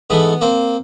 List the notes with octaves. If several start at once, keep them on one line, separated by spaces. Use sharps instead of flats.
G#2 E3 A3 B3
A#3 C4